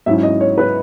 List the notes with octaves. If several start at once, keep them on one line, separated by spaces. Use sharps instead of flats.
G#2 F#3 C#4 E4 E5
D#5
C#5
B4